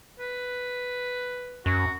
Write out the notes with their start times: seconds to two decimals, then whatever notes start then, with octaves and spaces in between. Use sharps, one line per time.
0.20 B4
1.66 F#2 F#4